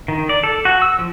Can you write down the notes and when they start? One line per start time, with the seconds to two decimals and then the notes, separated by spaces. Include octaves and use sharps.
0.08 D#3
0.29 D5
0.44 A4
0.65 F#4
0.82 E6
0.99 F3